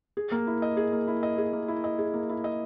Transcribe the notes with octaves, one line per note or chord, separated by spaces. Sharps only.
G#4
A#3
E4
D#5
G#4
A#3
E4
D#5
G#4
A#3
E4
D#5
G#4
A#3
E4
D#5